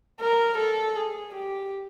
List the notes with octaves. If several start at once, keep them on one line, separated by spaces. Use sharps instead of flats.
A#4
A4
G#4
G4